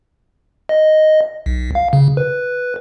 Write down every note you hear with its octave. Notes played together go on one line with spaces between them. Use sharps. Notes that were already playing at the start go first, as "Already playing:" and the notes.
D#5
B1
F5
C#3
B4